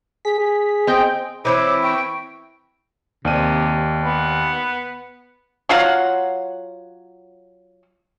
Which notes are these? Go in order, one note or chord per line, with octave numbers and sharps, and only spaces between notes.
G#4 B6
G#4
C4 D#5 G5
E3 C4 E4 B4 C#5 D6
G5 C#6
D#2 C3 D5 D#7
B3
F#3 F4 F5 F#5